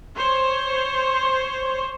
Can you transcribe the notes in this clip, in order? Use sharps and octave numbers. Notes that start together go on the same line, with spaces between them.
C5 C#5